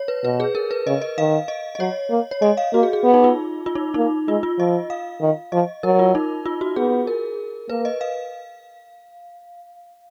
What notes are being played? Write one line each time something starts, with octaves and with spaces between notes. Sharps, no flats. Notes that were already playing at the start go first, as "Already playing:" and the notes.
Already playing: C#5
B4
B2 B4
G#4
A#4
B4
C#3 D#5
D#5
D#3 F5
D#5
D#5
F#3 C#5
A#3
C#5
G#3 D#5
F5
A#3 F#4
G#4
G#4
B3
D#4
F4
F4
D#4
A#3 D#4
G#3 F4
F4
F3 D#5
F5
D#3
F3 D#5
F#3 A#4
F4
D#4
F4
F#4
B3 G#4
A#4
A#3 B4
D#5
F5